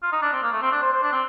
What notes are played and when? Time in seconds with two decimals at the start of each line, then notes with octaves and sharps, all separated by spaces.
0.03 F4
0.12 D#4
0.22 D4
0.32 C4
0.43 A#3
0.52 A3
0.62 C4
0.72 D4
0.82 C5
0.92 C5
1.02 D4
1.12 C4